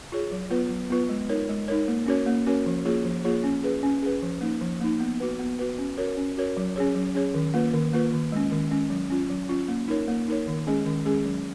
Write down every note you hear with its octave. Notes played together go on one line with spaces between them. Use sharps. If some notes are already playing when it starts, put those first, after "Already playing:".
F4 G#4 C#5
F#3
B3 F4 B4
F#3
B3 F4 B4
G#3
D#4 A#4 C#5
G#3
D#4 A#4 C#5
A#3
C#4 F#4 A#4 C#5
A#3
C#4 F#4 A#4 C#5
F3
A#3 F4 G#4 C#5
F3
A#3 F4 G#4 C#5
C#4
G#4 B4
C#4
G#4 B4
F3
A#3 D#4
F3
A#3 D#4
B3
F#4 B4
B3
F#4 B4
C#4
F#4 A#4 C#5
C#4
F#4 A#4 C#5
F#3
C#4 G#4 C#5
F#3
C#4 G#4 C#5
D#3
A#3 F4 B4
D#3
A#3 F4 B4
D#3
G#3 C#4
D#3
G#3 C#4
F#3
C#4 F4
F#3
C#4 F4
A#3
D#4 A#4 C#5
A#3
D#4 A#4 C#5
D#3
G#3 C#4 G#4
D#3
G#3 C#4 G#4
F#3